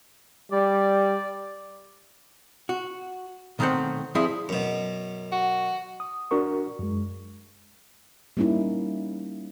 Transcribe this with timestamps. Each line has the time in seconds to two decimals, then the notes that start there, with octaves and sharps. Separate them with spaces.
0.52 G3 D5
2.69 F#4
3.59 B1 D#3 A3 C4 C5 F#5
4.15 F3 G3 C4 E4 G#4 F5
4.49 F#2 B2
5.32 F#4
6.00 D#6
6.31 D4 F#4 A#4 C#6
6.79 F#2 G#3
8.37 G3 A#3 C#4 D#4 E4